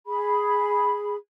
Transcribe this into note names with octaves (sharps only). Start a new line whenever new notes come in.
G#4 B5